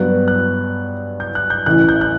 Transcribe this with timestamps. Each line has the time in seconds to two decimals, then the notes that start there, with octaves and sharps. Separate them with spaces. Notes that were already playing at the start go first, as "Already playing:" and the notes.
Already playing: G2 F#3 B3 F#6
0.28 F#6
1.20 G6
1.35 F#6
1.50 G6
1.66 A1 A2 E3 F#6
1.89 G6
2.01 F#6